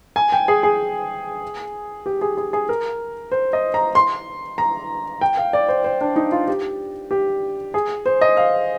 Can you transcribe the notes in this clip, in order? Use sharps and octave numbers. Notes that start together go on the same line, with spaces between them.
G#5
G5
G#4
G#4
G4
G#4
G#4
G#4
A#4
C5
D#5
A#5
C6
A#5
G5
F5
D5
C5
C5
D4
D#4
F4
G4
G4
G#4
C5
D#5
F5